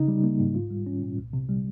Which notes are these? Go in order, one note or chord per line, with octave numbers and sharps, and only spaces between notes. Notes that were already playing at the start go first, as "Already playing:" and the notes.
Already playing: C#3 D#4
G3
A#3
G#2
F4
G3
C#4
A#2
C2
C3
G3